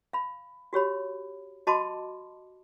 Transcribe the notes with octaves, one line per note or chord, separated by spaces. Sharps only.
F5 B5
F#4 G4 C#5 B5
F#4 D#5 A5 B5 C6 D6